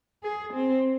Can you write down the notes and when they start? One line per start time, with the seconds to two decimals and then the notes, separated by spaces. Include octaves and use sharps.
0.23 G#4
0.54 C4